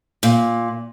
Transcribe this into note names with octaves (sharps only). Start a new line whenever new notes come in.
A#2